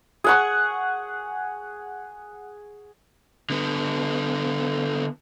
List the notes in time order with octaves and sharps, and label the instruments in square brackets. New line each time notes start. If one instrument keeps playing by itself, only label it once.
[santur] G#4 F#5 C#6
[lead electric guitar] D3 B3